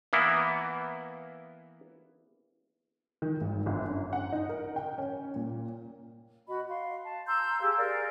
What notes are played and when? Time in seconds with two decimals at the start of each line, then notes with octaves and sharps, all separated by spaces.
0.13 E3 A#3 B3 E4
3.22 D#3
3.41 G#1
3.66 G1
3.88 F#2
4.13 F#5
4.32 D#4
4.49 A#4
4.76 G5
4.98 C#4
5.36 A#2
6.48 F#4 D#5 B5
6.69 F5 C6
7.04 A5
7.26 A#5 C6 E6 G6
7.61 G4 G#4 F5 E6
7.77 G#4 A#4 D5 F5